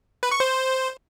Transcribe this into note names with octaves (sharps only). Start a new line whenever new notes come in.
B4
C#6
C5